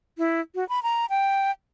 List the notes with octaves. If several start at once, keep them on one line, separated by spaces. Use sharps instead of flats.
E4
F#4
B5
A#5
G5